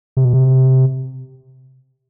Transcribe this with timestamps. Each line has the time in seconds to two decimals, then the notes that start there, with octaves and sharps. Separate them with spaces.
0.17 C3
0.25 B2
0.33 C3